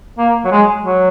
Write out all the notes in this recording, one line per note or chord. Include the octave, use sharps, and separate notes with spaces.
A#3
F#3
G#3
F#3